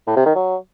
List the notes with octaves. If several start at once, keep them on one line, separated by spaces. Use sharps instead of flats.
A2
C3
D#3
F#3